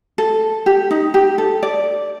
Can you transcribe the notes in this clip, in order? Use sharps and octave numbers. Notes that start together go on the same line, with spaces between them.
A4
G4
D#4
G4
A4
D5